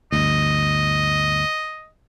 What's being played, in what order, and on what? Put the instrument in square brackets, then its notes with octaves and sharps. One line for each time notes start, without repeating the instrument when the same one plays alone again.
[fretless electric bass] G1 D2 [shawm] D#5